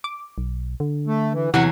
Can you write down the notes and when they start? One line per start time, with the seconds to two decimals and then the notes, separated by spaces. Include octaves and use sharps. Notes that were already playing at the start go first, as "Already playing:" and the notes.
0.04 D6
0.38 B1
0.80 D3
1.07 A3
1.33 E3
1.54 E2 C3 E3 F#3 F#5 G#5